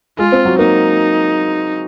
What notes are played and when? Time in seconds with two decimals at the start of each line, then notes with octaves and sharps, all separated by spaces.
0.18 G#3 F4
0.32 C4
0.45 F#3
0.59 A#3 D#4